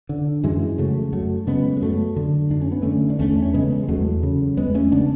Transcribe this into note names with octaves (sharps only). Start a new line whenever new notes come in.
D3
F#2 E3 G#3
C#3 F#3 A3
F#2 F#3 A3
C#3 G#3 B3
G#3
F#2 F#3 A3
D3
F#2 D4
C#4
B3
D3 A3 C#4
D4
E2 A3 C#4
C#4
C#3 G#3 B3
G#3
E2 F#3 A3
C#3
E2 G#3 B3
A3 C#4
C#3 B3 D4